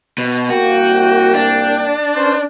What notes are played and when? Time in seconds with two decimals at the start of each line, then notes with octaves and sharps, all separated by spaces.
0.18 B2
0.50 C2 A#3 F#4 G5
1.35 D4
2.15 C#4 B4 C5